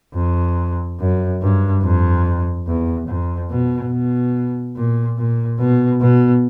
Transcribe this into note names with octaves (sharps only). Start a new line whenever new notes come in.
F2
F#2
G2
F2
E2
F2
B2
B2
A#2
A#2
B2
B2